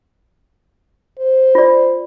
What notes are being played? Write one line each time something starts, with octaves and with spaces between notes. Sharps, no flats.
C5
F4 D5